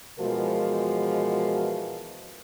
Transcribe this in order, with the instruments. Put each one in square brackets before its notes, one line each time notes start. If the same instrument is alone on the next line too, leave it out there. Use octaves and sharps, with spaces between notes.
[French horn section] B2 E3 F3 G#3 F#4 A#4